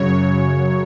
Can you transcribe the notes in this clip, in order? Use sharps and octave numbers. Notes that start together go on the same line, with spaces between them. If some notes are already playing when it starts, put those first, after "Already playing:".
Already playing: F#2 C#3 F#3 C#5